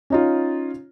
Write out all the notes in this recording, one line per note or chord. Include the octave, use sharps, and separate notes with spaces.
C#4 D#4 F4